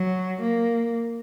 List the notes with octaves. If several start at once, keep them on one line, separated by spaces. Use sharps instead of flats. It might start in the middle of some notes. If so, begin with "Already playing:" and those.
Already playing: F#3
A#3